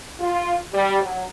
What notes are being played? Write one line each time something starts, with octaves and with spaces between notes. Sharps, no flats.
F4
G3
F#3